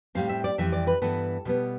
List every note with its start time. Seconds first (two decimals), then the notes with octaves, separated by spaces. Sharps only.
0.15 A2 G3 C4 F5
0.29 E5
0.44 D5
0.58 F2 E3 G3 C4 E5
0.72 D5
0.87 B4
1.02 G2 E3 B3 A4
1.45 B2 G3 B3